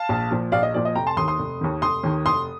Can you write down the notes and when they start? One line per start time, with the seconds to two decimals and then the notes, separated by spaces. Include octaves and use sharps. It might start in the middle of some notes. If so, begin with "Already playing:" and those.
Already playing: F5 A5
0.09 A#1
0.31 A#2 F3
0.52 A#1 D5 F5
0.63 D#5
0.74 A#2 F3 D5
0.85 D#5
0.96 F1 G5 A#5
1.07 A5 C6
1.17 D#2 C6 D#6
1.21 D#3
1.28 C6 D#6
1.39 F1
1.61 D#2 D#3
1.82 F1 C6 D#6
2.03 D#2 D#3
2.26 F1 C6 D#6